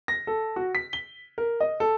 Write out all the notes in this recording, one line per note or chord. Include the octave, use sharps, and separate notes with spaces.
A#6
A4
F#4
B6
G7
A#4
D#5
A4